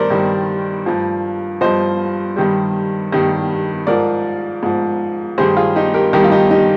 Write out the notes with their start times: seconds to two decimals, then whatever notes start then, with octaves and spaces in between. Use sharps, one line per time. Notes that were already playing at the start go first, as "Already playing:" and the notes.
Already playing: G2 D#3 G3 A#4 C5 D5
0.10 G2 D#3 G3
0.86 G2 F3
1.61 G2 F3 C5 D#5
2.36 G2 D#3 G3
3.12 G2 D#3 G3
3.87 G#2 F3 A#4 D5
4.63 G#2 F3
5.38 G2 D#3 G3 G#4 C5
5.57 F4 G#4
5.76 D#4 G4
5.94 G4 A#4
6.13 G2 D#3 G3 G4 A#4
6.24 F4
6.32 D#4 G4
6.51 D#4 G4